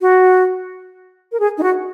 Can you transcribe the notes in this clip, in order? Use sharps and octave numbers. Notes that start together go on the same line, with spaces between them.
F#4
A#4
G#4
D#4
F#4